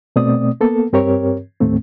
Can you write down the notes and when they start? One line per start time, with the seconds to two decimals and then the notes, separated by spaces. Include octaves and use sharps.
0.16 B2 A3 C4 D5 D#6
0.61 A#3 B3 A4
0.93 G2 C4 G4 A#4 C#5
1.60 D#2 A2 A3 C4